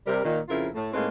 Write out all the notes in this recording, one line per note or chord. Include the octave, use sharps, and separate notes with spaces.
C3 G3 A#4
A#2 D#3
F2 C#3 E4 F4 A#4
A2 A3
A2 G#3 A#3 C4 D#4 B4